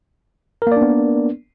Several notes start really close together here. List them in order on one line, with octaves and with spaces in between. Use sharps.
A#4 A#3 D5 D4 B3